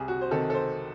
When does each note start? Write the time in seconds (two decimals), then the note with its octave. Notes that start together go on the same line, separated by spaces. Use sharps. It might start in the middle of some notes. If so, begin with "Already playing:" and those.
Already playing: C2 G#4
0.08 F#4
0.21 C5
0.31 C3 D#3 A4
0.50 A4
0.54 C5